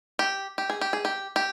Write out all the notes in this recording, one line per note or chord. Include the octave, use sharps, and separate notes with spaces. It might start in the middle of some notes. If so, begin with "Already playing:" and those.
G4
G4
G#4
G4
G#4
G4
G4